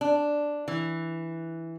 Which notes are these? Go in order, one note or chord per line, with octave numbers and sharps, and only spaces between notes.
D4
E3